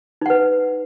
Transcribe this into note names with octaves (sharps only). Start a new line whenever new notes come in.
D#4 B4 F#5